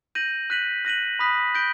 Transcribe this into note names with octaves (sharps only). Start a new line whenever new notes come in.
G6 A#6 D#7 F#7
F#6 B6 D#7 F#7
F#6 A#6 D#7 F#7
B5 D#6 F#6 B6
G6 A#6 D7 G7